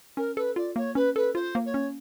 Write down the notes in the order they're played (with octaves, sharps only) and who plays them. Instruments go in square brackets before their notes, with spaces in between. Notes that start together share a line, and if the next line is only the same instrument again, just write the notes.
[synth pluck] C#4 [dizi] A#4
[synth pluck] A4 [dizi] B4
[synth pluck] F4 [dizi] D5
[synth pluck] A#3 [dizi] C#5
[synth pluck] C#4 [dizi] B4
[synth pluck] A4 [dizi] B4
[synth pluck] F4 [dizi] C5
[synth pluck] A#3
[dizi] C#5
[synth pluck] C#4